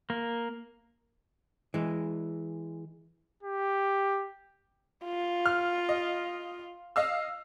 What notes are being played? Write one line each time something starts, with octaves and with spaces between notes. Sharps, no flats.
A#3
E3 G#3
G4
F4
F6
D#5
D#5 F5 E6